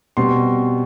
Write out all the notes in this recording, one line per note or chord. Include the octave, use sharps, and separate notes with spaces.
B2 G3 C4 C6